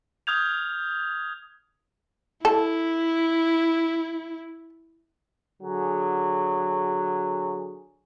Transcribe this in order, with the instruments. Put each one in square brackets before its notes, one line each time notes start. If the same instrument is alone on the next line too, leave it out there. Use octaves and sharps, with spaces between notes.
[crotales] D#6 F6 G6 G#6 F7
[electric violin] E4 [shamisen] A4
[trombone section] D3 F#3 G#4